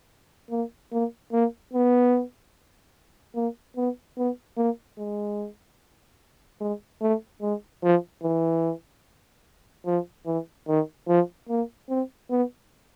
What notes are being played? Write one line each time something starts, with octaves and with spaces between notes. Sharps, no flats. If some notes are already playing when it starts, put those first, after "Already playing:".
A#3
A#3
A#3
B3
A#3
B3
B3
A#3
G#3
G#3
A3
G#3
F3
E3
F3
E3
D#3
F3
A#3
C4
B3